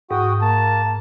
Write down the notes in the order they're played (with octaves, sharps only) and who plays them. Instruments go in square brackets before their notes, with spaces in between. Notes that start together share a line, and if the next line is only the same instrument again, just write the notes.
[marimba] G#2 [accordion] F#4 G5 D#6
[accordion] A#3 [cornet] A5